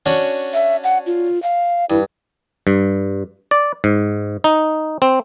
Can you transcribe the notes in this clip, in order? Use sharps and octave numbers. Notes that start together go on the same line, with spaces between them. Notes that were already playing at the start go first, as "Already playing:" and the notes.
C#4 D4 F#4
E5
F#5
F4
F5
G2 E4
G2
D5
G#2
D#4
C4